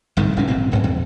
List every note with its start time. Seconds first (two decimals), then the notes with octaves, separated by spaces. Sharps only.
0.17 G1 C2 G#2 D#3
0.37 F1 A2 C3 C#4
0.48 G#1 A#2 C4
0.71 D1 G#1 F#2
0.84 E2